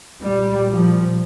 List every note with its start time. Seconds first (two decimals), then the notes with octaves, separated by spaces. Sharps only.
0.23 A#2 G3
0.70 F3